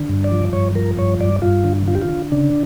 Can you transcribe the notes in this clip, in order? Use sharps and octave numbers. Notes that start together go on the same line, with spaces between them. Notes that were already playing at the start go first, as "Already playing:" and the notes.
Already playing: D3
G2
D5
F3
G2 C#5
F3 A#4
G2 C#5
G2 D5
G2 F4
D3
D3 F4
G4
F4
D3
C#3 D4